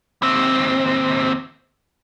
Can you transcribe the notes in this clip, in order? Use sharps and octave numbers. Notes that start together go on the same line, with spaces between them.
D#2 C4